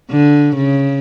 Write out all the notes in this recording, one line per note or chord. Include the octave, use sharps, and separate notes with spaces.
D3
C#3